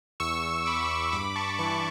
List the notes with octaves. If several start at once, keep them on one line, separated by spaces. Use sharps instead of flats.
E2 C#6 E6
E2 B5 D6
G2 B5 D6
A5 C#6
E3 A5 C#6